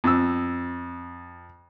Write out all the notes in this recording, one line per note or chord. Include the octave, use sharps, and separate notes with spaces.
F2 E6